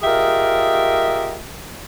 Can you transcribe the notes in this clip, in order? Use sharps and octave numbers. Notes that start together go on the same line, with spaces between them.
F4 G4 G#4 A#4 D#5 E5